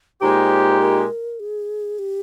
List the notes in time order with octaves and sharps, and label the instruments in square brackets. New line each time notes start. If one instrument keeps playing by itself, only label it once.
[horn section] A#2 G#3 D#4 G4 [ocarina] C5
[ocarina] A#4
G#4
G4